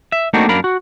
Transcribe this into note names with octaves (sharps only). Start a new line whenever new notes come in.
E5
A3 A#3 C4 D4 D#4 F#4
F#2 A#3 D4 A#4 B5
F#4